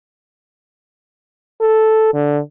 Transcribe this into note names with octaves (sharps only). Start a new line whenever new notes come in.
A4
D3